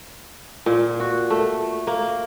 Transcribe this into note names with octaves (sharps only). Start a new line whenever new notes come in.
A#2
F#4
A3
A#3